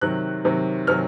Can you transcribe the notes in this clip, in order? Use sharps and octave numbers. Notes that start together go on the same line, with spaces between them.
C3 D#3 F#3 F#6
C3 D#3 F#3
C3 D#3 F#3 F6